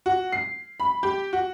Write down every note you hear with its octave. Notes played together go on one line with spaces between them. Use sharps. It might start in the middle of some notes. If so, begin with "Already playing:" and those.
F#4
C7
B5
G4
F#4